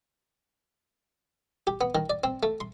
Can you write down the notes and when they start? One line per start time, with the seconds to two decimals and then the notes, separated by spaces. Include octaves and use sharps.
1.67 G4
1.81 B3
1.95 D#3
2.10 D5
2.24 C4
2.43 A3
2.61 C6